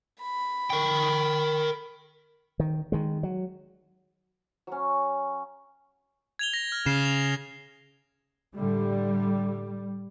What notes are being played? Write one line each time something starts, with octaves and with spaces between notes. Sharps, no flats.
B5
A#4 G5
D#3
D#3 G#3
F#3
F#3 C#4
G#6 F7 G7
A#6
F6
C#3 C7 E7
F7
A2 D3 G3